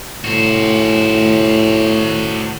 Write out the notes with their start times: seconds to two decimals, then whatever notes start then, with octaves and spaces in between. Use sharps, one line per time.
0.25 A2 F#4 C5